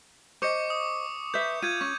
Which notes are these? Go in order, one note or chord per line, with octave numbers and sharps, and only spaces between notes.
C5 D#5 C#6 D6 C#7
D#6
B4 C5 E5 G6
F4 G6 G#6 D#7
C#4 C#6